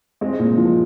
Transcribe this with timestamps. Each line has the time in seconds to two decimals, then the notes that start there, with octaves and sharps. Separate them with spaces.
0.21 G#3 C4
0.39 A#2
0.57 F3